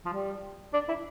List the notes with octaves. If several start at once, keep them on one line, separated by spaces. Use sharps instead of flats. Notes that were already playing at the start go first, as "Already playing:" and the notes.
F3
G3
D4
E4